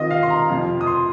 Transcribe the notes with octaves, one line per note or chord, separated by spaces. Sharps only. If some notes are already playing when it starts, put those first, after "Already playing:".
Already playing: C3 D#3 C4 F4 D#5
F5
C6
A#5
F2 C3 F3
D#6
C6